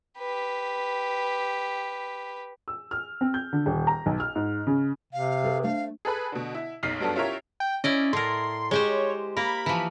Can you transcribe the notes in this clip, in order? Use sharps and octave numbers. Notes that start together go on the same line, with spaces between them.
G4 B4
E6
F6
C4
G6
D3
D#1
A#5
B1
F6
G#2
C#3
C3 F5
G#4 A4 B4
A3 D4 C5 F5
G#4 A4 B4 B5
B2 D3
E4
F#1 B1 D#4 F6 B6 C7
G2 F#3 B3 D4 A4
C#4 E4 F4 G4 A#4 C#5
G5
C#4 E4 D5 D#5
A2 A#4 C6
G#3 G4 C5 C#5
A#3 A#4 B5
E3 F3